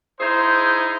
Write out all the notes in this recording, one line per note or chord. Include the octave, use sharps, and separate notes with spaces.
D#4 E4 G#4 C5